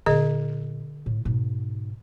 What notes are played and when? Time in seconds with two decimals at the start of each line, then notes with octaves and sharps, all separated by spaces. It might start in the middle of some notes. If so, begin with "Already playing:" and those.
0.06 A#2 D3 B3 G#4 D#5
1.06 A2
1.25 G#2 B2